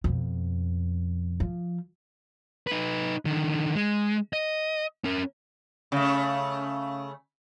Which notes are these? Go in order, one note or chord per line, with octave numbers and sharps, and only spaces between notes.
F2 B2
F3
D#4 B4
D3 D#3
G#3
D#5
C#4 A#4
C#3 A3